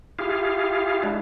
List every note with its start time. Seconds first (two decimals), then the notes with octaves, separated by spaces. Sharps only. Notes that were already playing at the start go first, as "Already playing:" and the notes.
0.19 E4 F4 G4 G#4 F5
1.04 G#3 D4 E4